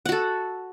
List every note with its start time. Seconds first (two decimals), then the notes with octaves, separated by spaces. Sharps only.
0.06 F#5
0.09 F#4
0.12 A4